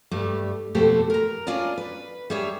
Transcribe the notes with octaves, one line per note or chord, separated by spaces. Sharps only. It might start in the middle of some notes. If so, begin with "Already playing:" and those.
G2 G3 A3
F2 B2 A3 G4 A4 C5
A#4 A#5
C#4 D4 F4 A#4 D5 D#5
B4
G3 D4 G#4 C#5 E5